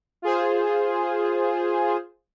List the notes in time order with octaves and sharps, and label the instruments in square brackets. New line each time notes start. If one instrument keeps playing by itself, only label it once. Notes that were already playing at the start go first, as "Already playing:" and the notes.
[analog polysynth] F4 G#4 C5